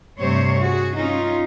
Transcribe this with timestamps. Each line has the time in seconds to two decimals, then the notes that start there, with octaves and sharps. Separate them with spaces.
0.20 G2 C3 A3 C5 C#5
0.61 F#4 G#4
0.97 C#4 D#4 F4